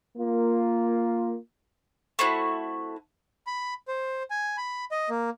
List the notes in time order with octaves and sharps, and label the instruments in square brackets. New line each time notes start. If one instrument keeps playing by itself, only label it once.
[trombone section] A#3 F4
[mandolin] A3 C4 E4 F#4
[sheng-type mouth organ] B5
C5
G#5
B5
D#5
A#3